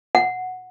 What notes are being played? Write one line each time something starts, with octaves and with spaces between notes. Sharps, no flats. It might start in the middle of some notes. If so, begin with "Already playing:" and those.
F#5